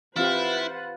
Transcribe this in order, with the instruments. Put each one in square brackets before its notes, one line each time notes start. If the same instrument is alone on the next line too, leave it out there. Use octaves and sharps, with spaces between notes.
[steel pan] E3 C4 G4 [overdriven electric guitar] E4 [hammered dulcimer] F4 [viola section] B4 C5 F#5